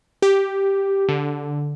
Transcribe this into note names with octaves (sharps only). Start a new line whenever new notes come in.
G4
D3